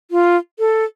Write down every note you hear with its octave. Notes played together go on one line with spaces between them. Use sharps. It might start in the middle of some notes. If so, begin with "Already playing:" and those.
F4
A4